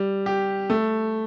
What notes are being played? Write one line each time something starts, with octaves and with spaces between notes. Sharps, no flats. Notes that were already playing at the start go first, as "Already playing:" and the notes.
Already playing: G3
G4
A3